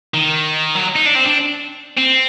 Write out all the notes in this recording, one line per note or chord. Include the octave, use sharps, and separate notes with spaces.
D#3
F#3
D#4
D4
C4
D4
C4